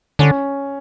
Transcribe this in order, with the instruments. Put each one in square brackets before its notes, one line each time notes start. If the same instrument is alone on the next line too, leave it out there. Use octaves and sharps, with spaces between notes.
[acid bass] D3 [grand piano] C#4